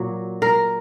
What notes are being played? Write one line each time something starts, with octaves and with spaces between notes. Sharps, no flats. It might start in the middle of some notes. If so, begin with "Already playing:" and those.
Already playing: A#2 F#3 F#4
A#4